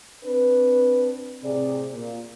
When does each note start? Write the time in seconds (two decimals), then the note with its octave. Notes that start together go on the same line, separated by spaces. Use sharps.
0.24 C4 D4 B4
1.43 A2 C3 C4 G#4 D5
1.93 A#2